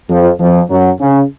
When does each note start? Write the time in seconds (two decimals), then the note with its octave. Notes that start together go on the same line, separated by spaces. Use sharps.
0.10 F2 F3
0.40 F2 F3
0.70 F#2 F#3
1.00 C#3 C#4